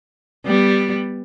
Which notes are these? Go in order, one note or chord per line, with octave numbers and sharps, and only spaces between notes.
G3 B3